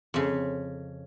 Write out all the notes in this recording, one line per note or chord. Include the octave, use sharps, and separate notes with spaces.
F2 C#3